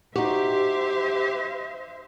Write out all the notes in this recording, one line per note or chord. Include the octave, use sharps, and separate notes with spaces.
D#4 F#4 G4 C5 E5